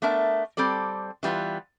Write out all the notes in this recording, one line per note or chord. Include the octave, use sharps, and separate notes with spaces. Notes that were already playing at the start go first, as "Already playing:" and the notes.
A3 B3 D4 A#4 E5
G3 C4 A4 D5
E3 G3 A#3 B3 F4